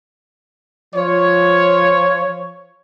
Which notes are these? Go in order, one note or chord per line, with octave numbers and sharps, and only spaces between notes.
F3 F4 C#5